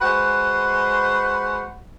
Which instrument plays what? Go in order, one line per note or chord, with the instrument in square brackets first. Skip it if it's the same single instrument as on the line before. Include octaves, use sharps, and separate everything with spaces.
[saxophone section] G#3 F#4 B4 C5 F#5